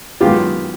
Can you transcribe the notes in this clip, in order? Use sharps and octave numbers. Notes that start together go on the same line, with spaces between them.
F#2 D#3 G#3 B3 F4 G4